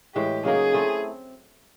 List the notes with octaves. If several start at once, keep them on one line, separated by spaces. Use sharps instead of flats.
A2 E3 G#3 G4
C#3 F#3 A#3 D#4 G#4
A3 C4 E4 A4